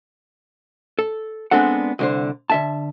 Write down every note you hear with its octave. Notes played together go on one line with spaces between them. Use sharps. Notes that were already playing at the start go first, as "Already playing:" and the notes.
A4
G#3 B3 C4 D4 A4 F#5
C2 D3 C5
D3 E5 A5